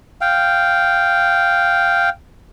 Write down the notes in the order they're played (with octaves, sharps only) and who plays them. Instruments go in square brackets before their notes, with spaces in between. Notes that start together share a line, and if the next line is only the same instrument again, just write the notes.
[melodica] F5 G5